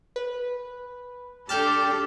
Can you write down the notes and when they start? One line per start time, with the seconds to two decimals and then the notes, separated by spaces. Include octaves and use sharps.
0.16 B4
1.49 D4 G4 A4 A5 F6 G6